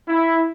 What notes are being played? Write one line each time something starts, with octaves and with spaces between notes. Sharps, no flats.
E4